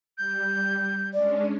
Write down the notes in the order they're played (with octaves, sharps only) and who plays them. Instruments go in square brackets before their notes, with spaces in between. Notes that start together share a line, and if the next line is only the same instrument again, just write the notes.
[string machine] G3 [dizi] G6
[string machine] G#3 C#4 D4 [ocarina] D5